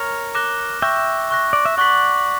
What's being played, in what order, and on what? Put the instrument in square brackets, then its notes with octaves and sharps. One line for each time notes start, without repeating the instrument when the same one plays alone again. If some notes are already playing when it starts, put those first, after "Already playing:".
Already playing: [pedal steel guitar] A#4 C#5
[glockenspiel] D6 F#6 A#6 E7 G7
[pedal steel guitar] E5 G5 [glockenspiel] C#6 F#6 A#6
[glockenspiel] C#6 F#6 A#6
[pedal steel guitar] D5
E5
[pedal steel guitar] D5 F#5 [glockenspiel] C#6 F#6 B6 F#7